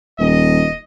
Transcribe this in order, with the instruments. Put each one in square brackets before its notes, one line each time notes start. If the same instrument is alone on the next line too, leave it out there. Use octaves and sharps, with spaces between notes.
[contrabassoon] D#1 [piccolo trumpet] D#5